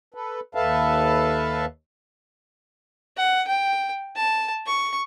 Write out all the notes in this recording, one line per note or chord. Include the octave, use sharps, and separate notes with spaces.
A4 B4
D#2 A4 B4 E5 F5 A5
F#5
G5
A5
C#6